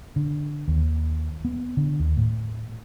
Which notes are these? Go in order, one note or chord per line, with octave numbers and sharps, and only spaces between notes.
D3
D#2
B3
D3
D#2
A2